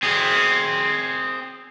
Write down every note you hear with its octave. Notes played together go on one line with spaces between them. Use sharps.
C4 G#4